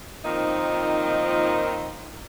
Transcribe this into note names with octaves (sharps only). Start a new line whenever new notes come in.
A#2 D#3 F3 A#3 C4 D#4